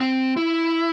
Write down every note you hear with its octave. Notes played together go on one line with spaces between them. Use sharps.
C4
E4